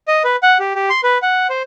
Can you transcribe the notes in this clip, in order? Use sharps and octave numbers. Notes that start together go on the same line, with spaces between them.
D#5
B4
F#5
G4
G4
C6
B4
F#5
C5